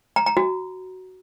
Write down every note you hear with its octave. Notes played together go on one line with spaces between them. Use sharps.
A#5
A#5
F#4